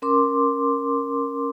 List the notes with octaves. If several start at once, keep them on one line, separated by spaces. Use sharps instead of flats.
C#4 A#4 C6 D6